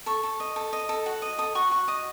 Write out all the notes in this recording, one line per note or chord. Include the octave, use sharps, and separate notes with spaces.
A4 C#6
A4
D#5
A4
D#5
A4
F#4
D#5
A4 D#6
F#4 C#6
F#4 C#6
D#5 D#6